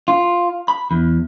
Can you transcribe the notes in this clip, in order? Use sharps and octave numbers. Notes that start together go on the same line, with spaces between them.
F4
B5
E2